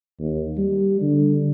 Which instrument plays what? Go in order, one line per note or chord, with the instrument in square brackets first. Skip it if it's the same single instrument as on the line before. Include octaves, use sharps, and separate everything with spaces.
[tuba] D#2
G3
D3